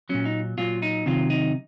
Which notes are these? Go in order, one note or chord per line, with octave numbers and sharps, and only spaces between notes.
A#2 F#3 C#4
D#4
A#2 F#3 F4
D#4
C3 D#3 F#3 F4
D#4